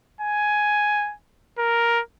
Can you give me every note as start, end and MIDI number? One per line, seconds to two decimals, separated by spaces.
0.21 1.14 80
1.59 2.01 70